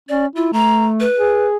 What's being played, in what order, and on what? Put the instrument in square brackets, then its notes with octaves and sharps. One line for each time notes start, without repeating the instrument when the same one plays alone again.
[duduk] C#4 [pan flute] D5
[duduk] E4 [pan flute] F4
[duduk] A3 [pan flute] A#5
[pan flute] B4
[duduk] G#4